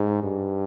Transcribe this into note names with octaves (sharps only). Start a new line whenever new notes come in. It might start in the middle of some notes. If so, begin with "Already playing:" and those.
Already playing: G#2
G2